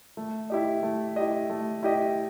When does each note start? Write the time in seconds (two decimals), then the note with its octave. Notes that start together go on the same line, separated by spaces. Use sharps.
0.17 A3
0.50 E4 G4 D#5
0.83 A3
1.16 E4 G4 D#5
1.50 A3
1.83 E4 G4 D#5